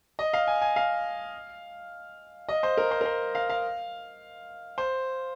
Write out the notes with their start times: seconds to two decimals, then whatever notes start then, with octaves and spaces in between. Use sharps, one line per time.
0.19 D#5
0.33 F5
0.47 G#5
0.62 G#5
0.76 F5
2.49 D#5
2.63 C5
2.77 A#4
2.91 C5
3.01 A#4
3.06 C5
3.35 F5
3.49 F5
4.78 C5